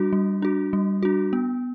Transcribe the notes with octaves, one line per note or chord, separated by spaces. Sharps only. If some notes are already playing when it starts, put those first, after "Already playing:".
Already playing: G3 D4 F#4
G3
D4 F#4
G3
D4 F#4
B3